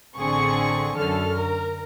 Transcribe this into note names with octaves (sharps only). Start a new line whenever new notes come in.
A1 D3 C4 G#4 C#6 C#7
F#2 D3 C#4 A4 F6
A#4